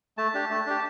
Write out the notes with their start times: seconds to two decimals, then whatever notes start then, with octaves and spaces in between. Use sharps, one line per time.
0.18 A3 A5
0.34 D4 G4
0.50 A3
0.66 D4 G4